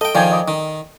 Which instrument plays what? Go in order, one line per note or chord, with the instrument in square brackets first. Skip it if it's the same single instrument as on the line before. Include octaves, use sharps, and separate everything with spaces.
[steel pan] A4 [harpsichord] D#5 G5
[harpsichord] D#3 F3 [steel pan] D5 G5 G#5
[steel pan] D#5 G5 D6
[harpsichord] D#3